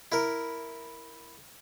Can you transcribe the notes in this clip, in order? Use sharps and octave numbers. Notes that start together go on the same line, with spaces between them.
E4 A#4